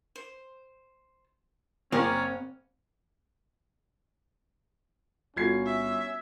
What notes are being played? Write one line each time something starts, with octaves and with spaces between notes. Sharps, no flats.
C5
F#1 C4 C#4 G#4 A#4 D5
G1 C#4 F4 F#4 A4 G#6 C7
E5